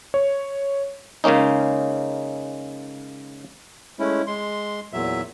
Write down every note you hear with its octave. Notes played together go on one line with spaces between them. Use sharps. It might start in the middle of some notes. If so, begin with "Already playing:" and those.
C#5
C#3 G#3 A#3 C#4 D#4
G#3 A3 C#4 E4
G#3 C6
E2 A#2 F#3 E5